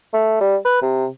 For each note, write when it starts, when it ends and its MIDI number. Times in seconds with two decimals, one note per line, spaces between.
0.14 0.38 57
0.41 0.56 55
0.65 0.80 71
0.82 1.07 48